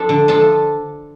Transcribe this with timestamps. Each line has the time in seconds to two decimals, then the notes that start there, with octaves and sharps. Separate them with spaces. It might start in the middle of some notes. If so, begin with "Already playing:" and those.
Already playing: F3 D4 A4
0.09 D3
0.28 F3 D4 A4